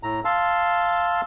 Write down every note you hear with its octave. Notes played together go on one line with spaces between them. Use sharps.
A2 A#5
F5 A5 C6 E6